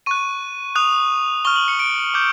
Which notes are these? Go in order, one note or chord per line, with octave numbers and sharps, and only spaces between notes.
C#6 F#6 D#7
D#6 F#6 F7
C#6 F6 G7
F#7
C#7
D7
D6 G6